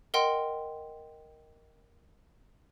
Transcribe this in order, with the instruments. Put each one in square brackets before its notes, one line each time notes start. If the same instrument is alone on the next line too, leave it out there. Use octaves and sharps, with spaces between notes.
[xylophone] A#4 D#5 F#5 G5 C6